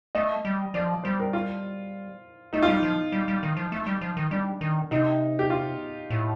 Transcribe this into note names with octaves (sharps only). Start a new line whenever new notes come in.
A3 D#5
G3
F3 D5
G3 C5
A#4
F4
A3 D#4
F4
G3 D#4
F3
G3
G3
D#3
F3
A3
G3
F3
D#3
G3 D4
D#3
C3 D#4
G4
F4
A2